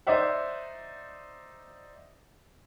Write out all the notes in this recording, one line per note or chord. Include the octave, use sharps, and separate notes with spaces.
D#4 C5 D5 E5 F#5